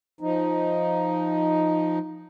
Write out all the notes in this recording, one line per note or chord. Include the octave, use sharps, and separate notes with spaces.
F3 D#4